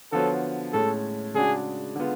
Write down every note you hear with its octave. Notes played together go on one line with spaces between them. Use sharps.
D3 F3 B3 F#4 A4 C#5
A2 G#3 C#4 A4
C#3 G#3 D4 F#4 G#4
D3 G#3 B3 F4